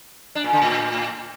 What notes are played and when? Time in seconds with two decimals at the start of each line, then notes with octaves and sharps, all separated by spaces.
0.35 D4
0.44 A#2
0.53 D3
0.62 A2